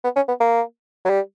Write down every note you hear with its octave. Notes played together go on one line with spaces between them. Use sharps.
B3
C#4
B3
A#3
F#3
G3